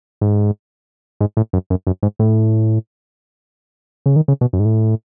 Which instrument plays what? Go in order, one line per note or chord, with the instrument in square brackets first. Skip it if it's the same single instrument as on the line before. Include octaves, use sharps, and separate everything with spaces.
[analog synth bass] G#2
G#2
A2
F#2
F#2
F#2
G#2
A2
C#3
D#3
C#3
B2
F#2
G#2
A2